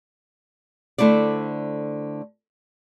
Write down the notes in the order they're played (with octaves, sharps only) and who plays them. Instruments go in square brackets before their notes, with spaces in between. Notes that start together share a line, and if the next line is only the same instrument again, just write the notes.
[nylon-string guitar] D3 A3 E4 C5 D5